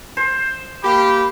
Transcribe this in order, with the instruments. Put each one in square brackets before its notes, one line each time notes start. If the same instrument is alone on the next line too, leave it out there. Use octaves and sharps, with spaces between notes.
[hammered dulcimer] C5
[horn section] A#3 G4 [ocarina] B5